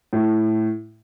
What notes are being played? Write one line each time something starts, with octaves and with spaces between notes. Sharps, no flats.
A2